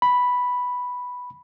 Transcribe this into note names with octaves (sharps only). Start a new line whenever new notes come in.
B5